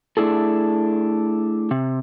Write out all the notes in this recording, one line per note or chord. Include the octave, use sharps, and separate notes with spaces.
A3 D4 E4 G#4 A4
C3